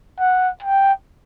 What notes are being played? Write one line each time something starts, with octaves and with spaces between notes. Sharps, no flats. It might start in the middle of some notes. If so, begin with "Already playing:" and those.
F#5
G5